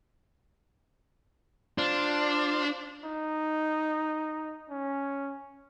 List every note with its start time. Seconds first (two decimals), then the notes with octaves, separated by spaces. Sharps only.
1.78 D4 F4 C5
3.05 D#4
4.70 C#4